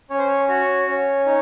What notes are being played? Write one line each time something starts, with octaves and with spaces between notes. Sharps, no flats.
C#4 C#5
C5
C#5
F#4 C#5
C#4 C#5
D#4 C#5